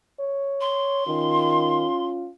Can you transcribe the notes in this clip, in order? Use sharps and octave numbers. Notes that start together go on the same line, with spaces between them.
C#5
C6
D#3 C#4 F4